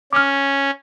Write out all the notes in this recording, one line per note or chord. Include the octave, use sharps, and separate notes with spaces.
C#4 D6 F6